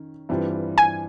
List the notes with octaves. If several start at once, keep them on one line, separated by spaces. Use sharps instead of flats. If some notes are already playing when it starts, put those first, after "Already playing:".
Already playing: D#3 C#4
G2 E3 G3 C4 F4
G#5